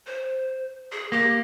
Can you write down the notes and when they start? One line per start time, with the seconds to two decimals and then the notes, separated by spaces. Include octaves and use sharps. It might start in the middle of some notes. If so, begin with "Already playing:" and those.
0.06 C5
0.92 G#4
1.12 A#3 G4